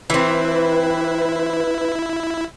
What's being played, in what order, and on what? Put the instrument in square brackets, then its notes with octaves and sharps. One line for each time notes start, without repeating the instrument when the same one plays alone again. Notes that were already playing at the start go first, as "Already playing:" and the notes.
[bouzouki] E3 C4 [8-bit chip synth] E4 [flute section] B4